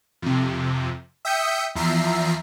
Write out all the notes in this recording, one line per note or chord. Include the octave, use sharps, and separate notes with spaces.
F2 C3
E5 G5 D#6 G6 B6 C#7
E2 F3 E5 A#5 C7